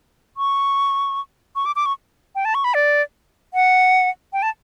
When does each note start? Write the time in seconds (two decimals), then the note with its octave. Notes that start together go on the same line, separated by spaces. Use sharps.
0.37 C#6
1.56 C#6
1.66 D6
1.76 D6
1.86 C#6
2.35 G5
2.45 A5
2.55 C#6
2.64 B5
2.74 D5
3.54 F#5
4.33 G5
4.42 A5